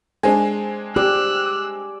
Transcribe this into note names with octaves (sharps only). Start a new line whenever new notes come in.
G#3 C4 D4 G#5
G4 D5 E6 F#6